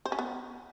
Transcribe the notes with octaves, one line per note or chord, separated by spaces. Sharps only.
C5
C#4
B3